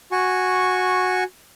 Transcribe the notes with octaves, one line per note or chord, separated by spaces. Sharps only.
F#4 G#5 C#6